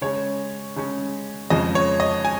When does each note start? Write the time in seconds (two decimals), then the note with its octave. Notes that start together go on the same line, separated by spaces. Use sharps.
0.01 C#3 G#3 C#4 C#5
0.76 C#3 G#3 C#4
1.50 F2 C#3 G#3 C#4 D#5
1.75 C#5
2.00 D#5
2.25 G#5